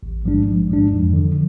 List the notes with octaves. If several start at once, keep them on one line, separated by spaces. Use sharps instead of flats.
A1
G#2 F3 G#3 D4
A1
G#2 F3 G#3 D4
F2
D3 F3